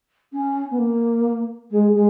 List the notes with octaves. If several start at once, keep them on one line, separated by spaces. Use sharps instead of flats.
C#4
B3
A#3
G#3
G#3